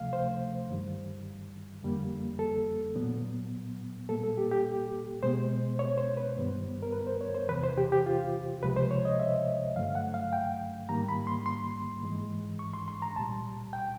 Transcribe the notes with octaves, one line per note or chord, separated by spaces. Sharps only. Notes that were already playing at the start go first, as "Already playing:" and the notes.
Already playing: D2 C3 F3 A3 F5
C5
G2 D#3 G3
F2 D3 G3 A#3
A4
A#2 F#3 B3
A#2 G3 A#3 A4
A4
G4
G4
B2 G#3 B3 C5
C#5
C5
B4
G2 D#3 G3 B3
A#4
B4
C5
C#5
C5
E2 C3 E3 B4
C5
G4
G4
F4
C#2 C3 F3 G#3 B4
C5
C#5
D#5
E5
G2 D3 F#3 A3 F5
F#5
F5
G5
G#2 D#3 G3 A#3 A#5
B5
C6
C6
G#2 E3 G#3
C#6
C6
C6
A#5
C2 A#2 G3 A5
G5